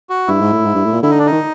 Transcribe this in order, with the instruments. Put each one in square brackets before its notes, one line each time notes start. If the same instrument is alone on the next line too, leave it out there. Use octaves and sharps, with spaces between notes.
[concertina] F#4
[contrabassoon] G2 [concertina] E4
[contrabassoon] G#2
A2
G#2
G2
A2
A#2
[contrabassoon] D3 [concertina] E4
[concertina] D#4
D4
D#4
[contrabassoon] D#3